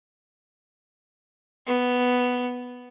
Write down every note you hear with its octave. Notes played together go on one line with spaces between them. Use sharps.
B3